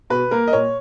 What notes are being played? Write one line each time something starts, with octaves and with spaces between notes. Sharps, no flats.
B2 B4
A#3 A#4
D#5
A#2 C#5